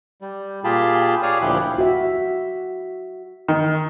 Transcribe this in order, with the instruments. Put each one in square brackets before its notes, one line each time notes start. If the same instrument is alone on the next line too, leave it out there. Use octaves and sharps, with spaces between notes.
[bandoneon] G3
A#2 F4 G4 G#4 A5 B5
G#4 C#5 D5 F5 D#6
D2 A#2 F3 E4 G4 F#6
[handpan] F#4 E5
[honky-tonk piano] D#3